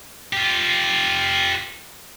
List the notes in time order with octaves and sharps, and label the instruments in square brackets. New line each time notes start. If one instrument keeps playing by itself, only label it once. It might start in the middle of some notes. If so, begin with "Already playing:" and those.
[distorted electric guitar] F4 G4